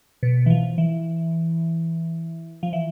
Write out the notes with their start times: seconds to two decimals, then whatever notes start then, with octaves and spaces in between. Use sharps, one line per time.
0.23 B2
0.46 E3
0.50 F3
0.78 E3
2.63 F3
2.73 E3